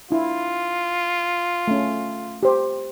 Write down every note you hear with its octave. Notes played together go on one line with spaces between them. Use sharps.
D4 E4 F4
A3 C#4
G4 C5